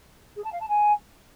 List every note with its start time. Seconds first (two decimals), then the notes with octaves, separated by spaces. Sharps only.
0.36 G#4
0.44 A5
0.52 F5
0.60 A5
0.68 G#5